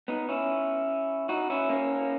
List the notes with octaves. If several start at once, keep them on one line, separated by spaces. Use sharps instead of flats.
B3 D#4
C#4 E4
D#4 F#4
C#4 E4
A#3 C#4